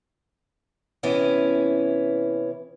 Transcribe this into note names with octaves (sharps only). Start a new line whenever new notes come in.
C3 E3 B3 C#4 E4